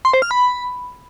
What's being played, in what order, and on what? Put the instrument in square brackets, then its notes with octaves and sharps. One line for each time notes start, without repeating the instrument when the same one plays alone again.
[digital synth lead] C6
C5
F6
B5